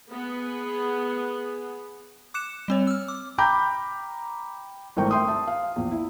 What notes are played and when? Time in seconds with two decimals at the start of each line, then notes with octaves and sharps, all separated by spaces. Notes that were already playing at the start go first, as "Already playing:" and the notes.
0.12 B3 G#4
2.34 D6 F#6 C#7 E7
2.68 G3 C4 C#5
2.87 E6 F6
3.08 D6
3.38 G5 A#5 B5 D6 G6
4.97 G#1 E3 A3 A#4 G5 C#6
5.11 E5 G5 C6 D#6
5.28 E5 A5
5.47 F5
5.76 A#1 E2
5.91 E4